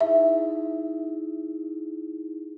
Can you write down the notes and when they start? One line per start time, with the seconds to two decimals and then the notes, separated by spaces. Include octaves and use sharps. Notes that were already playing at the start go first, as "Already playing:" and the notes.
0.01 D#4 E4 G#4 E5